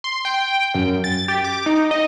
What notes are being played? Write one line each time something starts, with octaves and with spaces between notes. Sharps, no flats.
C6
G5
F#2
A6
G4
D6
D#4
D#5